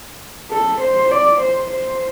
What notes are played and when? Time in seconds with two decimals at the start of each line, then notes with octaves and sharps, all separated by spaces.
0.51 A4
0.82 C5
1.11 D5
1.41 C5
1.71 C5